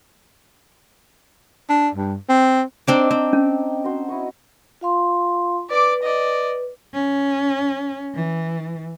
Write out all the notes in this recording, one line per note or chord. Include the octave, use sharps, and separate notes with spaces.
D4
G2
C4
C4 D4 D#4 D#5 G5 D6
C4
C#4 G5
F#4 C5
E4 D#5 C#6
F4 F5 C6
B4 D5 D6
D5 D#5
C#4
E3